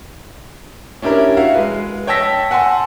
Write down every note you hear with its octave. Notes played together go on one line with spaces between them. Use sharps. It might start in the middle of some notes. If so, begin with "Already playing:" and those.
C#4 D4 E4 G4 A#4
F#4 E5 F5
G#3 B4
C#5 G5 A5 E6 A#6 B6
F#5 G#5 A5 C6 E6